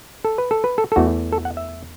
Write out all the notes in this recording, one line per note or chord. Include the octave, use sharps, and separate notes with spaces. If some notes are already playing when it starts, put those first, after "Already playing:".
A4
B4
A4
B4
A4
A4
E2 E3 A3 F#4
A4
F#5
E5